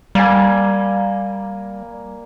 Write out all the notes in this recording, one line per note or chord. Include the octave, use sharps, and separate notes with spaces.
G3 A#3 G#5